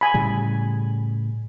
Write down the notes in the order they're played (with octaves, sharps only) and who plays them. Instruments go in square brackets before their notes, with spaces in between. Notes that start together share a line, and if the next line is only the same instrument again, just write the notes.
[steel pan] G#5 B5
[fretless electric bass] A2 C#3 G3